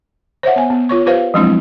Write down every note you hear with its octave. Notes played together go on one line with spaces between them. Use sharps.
C5 C#5 E5 F#5
B3 G#5
B3
F4 C#5 C#6
F4 G4 B4 C5 F5
F3 F#3 G#3 C4 D4 E4